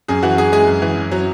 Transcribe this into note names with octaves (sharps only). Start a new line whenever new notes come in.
F#2 G#4
E3 F#4
F#2 G#4
G#3 G#4
F#2
E3
F#2
F#3